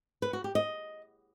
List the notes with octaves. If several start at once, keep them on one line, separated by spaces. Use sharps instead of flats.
B4
F#4
G4
D#5